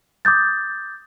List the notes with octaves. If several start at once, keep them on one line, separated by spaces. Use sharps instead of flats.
D6 D#6 G6 A6